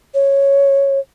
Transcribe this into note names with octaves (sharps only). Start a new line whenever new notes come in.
C#5